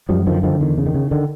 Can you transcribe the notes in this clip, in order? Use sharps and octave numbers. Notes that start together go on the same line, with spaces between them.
F#2 F3 G3
D3 D#3 F3
D3 D#3 F3
E2 D#3
C#3
D#3
C#3
D3 D#3